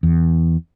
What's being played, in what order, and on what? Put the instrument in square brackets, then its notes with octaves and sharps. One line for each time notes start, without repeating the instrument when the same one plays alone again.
[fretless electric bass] E2